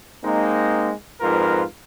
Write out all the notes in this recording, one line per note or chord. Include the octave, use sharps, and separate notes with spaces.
G#3 A#3 C4 D#4
F2 G#2 F4 A#4 B4